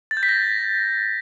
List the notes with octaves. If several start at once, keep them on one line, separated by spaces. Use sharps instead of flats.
A6
G6
B6
A#6